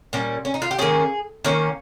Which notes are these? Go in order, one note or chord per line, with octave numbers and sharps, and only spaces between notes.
A#2 G3 C#4
C#4
D#4
F4
G4
D#3 A#3 C#4 G#4
D#3 A#3 C#4